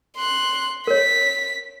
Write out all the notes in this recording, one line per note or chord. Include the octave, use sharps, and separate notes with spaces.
C6 F#6
A#4 C#5 B6